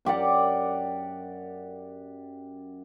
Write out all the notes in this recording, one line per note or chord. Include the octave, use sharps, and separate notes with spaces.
F#2 G4 D5 F#5